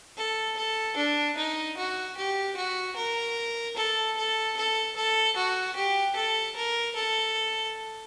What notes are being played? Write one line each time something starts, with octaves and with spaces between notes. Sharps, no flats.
A4
A4
D4
D#4
F#4
G4
F#4
A#4
A4
A4
A4
A4
F#4
G4
A4
A#4
A4